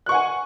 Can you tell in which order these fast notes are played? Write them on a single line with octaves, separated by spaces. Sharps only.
F#6 C#6 F#5 G#5